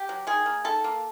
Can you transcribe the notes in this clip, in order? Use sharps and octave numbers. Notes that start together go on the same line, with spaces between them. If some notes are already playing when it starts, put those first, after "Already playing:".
Already playing: G4
F#3
D#3 G#4
A#3
D#3 A4
A#3